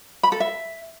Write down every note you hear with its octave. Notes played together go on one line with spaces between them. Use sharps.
B5
A4
E5